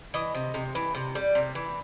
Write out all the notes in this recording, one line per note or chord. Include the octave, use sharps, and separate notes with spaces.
E3 D#5
C3
C3
E3
C3
G3
C3
E3